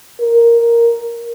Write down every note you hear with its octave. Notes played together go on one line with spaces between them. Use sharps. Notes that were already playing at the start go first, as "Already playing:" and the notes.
A#4